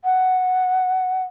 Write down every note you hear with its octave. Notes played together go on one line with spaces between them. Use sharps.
F#5